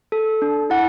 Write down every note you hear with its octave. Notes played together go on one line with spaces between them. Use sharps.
A4
D4
E4 F#5